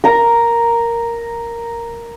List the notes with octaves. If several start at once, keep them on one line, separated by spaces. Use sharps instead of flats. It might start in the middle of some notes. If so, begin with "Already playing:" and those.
A#4 A#5